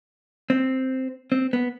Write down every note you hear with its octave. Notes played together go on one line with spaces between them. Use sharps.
C4
C4
B3